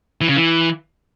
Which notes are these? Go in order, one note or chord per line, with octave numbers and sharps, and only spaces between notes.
E3
C#3
E3